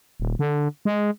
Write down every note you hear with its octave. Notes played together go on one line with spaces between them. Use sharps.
D#1
D3
G#3